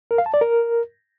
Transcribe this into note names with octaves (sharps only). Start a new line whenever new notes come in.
A#4
F5
A5
D5
A#4